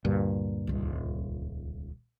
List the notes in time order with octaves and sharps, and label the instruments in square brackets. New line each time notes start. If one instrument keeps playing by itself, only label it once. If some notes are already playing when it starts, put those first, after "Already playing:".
[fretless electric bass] D2 G2 A#2
[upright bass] D#1 C#2